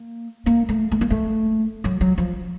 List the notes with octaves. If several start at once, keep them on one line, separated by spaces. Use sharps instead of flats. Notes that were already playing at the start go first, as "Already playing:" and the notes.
Already playing: A#3
A#3
A3
A3
A#3
A3
F#3
F#3
F3